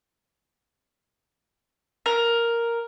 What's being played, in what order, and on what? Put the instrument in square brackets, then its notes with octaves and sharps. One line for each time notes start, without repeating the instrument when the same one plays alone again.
[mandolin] A#4